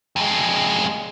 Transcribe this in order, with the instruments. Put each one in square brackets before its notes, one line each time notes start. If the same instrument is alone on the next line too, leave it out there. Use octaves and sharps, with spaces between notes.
[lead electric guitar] F2 G#3